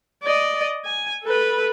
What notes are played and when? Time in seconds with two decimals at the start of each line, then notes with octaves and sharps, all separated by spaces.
0.24 D5 D#5
0.85 G#5
1.24 A4 B4